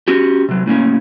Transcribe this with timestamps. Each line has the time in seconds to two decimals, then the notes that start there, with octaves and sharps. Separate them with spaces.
0.08 C#4 F#4 G4
0.49 C3 F#3
0.66 A2 C#3 A#3 C#4